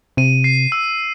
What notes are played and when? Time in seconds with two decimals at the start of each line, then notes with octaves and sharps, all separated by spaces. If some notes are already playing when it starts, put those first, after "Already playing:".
0.17 C3 D#7
0.44 C7
0.72 E6